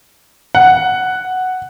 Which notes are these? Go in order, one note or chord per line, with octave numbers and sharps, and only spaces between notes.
F#5